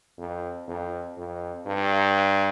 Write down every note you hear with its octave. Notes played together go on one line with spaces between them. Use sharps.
F2
F2
F2
G2